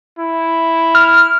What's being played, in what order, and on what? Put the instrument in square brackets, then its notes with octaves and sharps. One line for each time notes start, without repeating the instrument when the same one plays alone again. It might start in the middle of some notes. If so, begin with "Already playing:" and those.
[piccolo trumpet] E4
[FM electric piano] F6